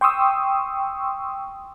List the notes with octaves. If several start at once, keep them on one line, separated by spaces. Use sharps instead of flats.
G5 C6 C#6 D#6 E6